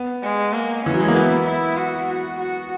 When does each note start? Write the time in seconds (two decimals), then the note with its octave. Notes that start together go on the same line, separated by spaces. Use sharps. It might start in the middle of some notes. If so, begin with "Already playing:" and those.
Already playing: B3
0.23 G#3
0.53 A#3
0.85 E3 C#4
0.93 F#3
1.00 G#3
1.08 A#3
1.15 B3 E4
1.46 E4
1.77 F#4
2.09 F#4
2.39 F#4